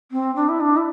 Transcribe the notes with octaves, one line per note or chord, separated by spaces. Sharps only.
C4
D4
E4
D4
E4